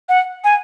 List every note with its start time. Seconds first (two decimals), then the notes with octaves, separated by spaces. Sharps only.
0.09 F#5
0.44 G#5